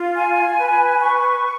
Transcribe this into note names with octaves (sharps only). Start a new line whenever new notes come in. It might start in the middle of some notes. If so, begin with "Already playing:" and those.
Already playing: F4
G#5
B4
C#6